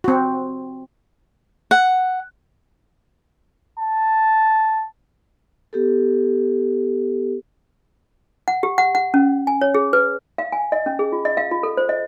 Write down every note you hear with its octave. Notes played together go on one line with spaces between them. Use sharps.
C4 F#4
F#5
A5
B3 G4 A4
F#5
G4
F#5
F#5
C#4
G#5
C#5
G#4
B4
F5
G#5
D#5
C#4
G#4
F4
D#5
F5
F4
A4
C5
D#5